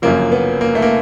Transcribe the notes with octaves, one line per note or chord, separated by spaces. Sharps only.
G1 F#2 C#3 F3 A#3
B3
A#3
A3
A#3